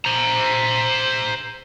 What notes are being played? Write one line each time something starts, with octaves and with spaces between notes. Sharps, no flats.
C5 A#5